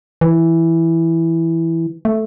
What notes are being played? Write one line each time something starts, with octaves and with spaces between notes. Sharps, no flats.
E3
A3